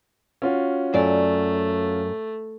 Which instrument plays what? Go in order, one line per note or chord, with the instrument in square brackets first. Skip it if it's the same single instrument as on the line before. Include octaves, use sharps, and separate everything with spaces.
[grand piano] C#4 F4 F#4
[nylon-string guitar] F#2 D5 [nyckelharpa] A3